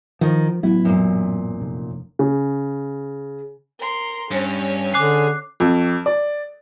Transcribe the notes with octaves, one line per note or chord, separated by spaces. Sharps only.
D#3 F3
A1 F#3 B3 E4
F#2 A#2
F1
C#3
A#4 C6
G2 C#4 C#5
D3 G#4 D6 F#6 C7
F2
D5